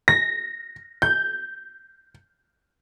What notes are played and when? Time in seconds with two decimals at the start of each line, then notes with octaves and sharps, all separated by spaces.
0.08 A#6
1.02 G6